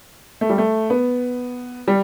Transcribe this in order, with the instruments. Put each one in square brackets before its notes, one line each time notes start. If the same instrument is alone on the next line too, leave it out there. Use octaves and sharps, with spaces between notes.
[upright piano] A3
G3
A3
B3
G3